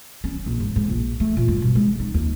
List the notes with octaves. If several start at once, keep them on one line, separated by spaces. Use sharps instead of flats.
C#4
A#1
G#2
G#2
A#1
A3
A#2
G2
B2
G#3
D#4
D#2